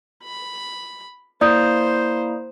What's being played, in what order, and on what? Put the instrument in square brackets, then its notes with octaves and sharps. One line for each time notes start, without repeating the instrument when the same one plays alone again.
[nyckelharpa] B5
[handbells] A#3 E4 A#5 [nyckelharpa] C5 [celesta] D5 D#6 G6